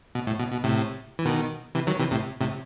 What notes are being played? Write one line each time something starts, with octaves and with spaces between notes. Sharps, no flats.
B2
A2
B2
B2
A2 C3
E3
B2 D#3
C3 E3
D#3 F#3
C3 E3
A2 C3
A2 C3